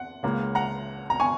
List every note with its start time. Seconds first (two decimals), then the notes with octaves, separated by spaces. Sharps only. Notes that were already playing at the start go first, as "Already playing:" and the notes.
Already playing: F#5
0.23 C#2 C#3 A#3
0.55 F#5 A#5
1.10 A#5
1.20 G#5 C#6